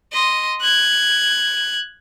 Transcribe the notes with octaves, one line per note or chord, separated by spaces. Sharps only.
D#5 C6
F#6 G#6